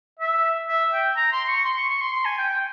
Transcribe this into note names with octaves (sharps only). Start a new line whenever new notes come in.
E5
E5
G5
A#5
C6
C6
C#6
C6
C#6
C#6
C6
C6
G#5
G5
G5